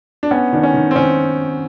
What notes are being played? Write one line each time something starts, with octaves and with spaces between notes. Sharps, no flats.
D4
B3 C#4
D#3 D4
C#4
D#3
C4
D#3 C#4